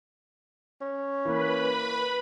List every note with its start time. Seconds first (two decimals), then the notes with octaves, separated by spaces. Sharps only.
0.81 C#4
1.25 E3 A#3 B4 B5